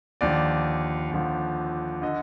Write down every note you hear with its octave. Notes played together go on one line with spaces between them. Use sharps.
D#2 D3 F3 D5
D#2 D3 F3
D3 D#5